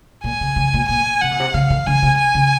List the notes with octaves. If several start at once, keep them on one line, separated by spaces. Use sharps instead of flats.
A#2 G#5
C#3
C#3
A#2
A#2 G#5
C3 F#5
A#2
C3
C#3 F5
D#3
C#3 G#5
C3
G#5
C#3